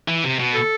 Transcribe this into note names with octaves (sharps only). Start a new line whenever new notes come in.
E3
C3
B2
A4